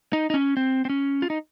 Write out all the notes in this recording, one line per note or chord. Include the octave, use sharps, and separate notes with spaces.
D#4
D#4
C#4
C4
C4
C#4
F4
D#4